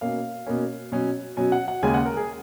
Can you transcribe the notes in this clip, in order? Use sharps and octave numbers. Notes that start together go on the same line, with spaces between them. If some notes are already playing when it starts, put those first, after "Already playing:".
B2 A#3 C#4 F5
B2 A#3 C#4
B2 F#3 C#4
B2 F#3 C#4 G#5
F#5
F#5
D#2 C#3 G#3 C#4 G#5
F#5
A#4
G#4